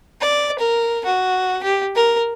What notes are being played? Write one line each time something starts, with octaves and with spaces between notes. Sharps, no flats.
D5
A#4
F#4
G4
A#4